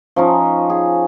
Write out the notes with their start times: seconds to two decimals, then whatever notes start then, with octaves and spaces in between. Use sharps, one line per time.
0.16 F3 C#4 D#4
0.70 G#4